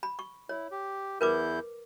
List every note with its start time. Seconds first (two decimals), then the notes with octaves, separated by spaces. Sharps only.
0.03 B5
0.19 C#6
0.49 E4 C#5
0.72 G4
1.21 E2 E4 A#4 B4 D6 G6